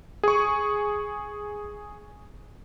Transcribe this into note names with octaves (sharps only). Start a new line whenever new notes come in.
G#4 C#6